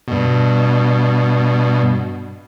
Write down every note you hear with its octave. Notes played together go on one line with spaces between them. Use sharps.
G2 B2